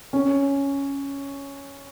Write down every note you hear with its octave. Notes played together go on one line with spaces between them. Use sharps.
C#4